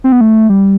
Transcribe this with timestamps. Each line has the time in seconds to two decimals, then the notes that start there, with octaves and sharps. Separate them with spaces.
0.04 C4
0.12 B3
0.21 A3
0.49 G3